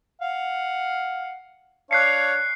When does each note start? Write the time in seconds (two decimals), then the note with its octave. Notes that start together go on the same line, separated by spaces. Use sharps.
0.21 F5 F#5
1.91 D4 C#5 F5 F#6 C7 C#7